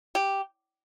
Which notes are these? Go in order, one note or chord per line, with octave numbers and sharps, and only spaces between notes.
G4